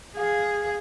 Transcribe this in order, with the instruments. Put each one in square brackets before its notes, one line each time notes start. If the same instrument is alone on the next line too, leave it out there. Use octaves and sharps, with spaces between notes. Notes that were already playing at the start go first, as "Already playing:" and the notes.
[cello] G#4 [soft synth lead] F5